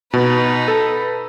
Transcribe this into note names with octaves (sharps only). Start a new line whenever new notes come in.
B2 D#4 B4
A4